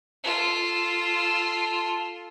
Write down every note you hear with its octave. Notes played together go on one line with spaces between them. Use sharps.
F4 A4